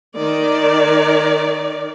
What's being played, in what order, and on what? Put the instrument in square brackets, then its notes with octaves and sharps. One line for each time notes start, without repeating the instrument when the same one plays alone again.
[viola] D#3 D5